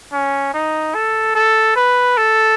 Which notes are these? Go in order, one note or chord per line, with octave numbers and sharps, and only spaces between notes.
C#4
D#4
A4
A4
B4
A4